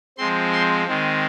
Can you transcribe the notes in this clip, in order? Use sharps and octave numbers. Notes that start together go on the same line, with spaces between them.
F3 G#3 C4 C6
C6
D#3 G#3 C4